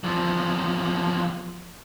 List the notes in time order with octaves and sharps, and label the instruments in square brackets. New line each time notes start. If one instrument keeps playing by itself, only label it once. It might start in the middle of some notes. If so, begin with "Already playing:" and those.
[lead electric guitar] E2 F3